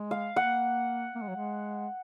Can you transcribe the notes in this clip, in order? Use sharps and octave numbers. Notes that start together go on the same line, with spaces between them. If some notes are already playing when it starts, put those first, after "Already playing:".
Already playing: G#3
F5
A#3 F#5
A#3
G#3
F#3
G#3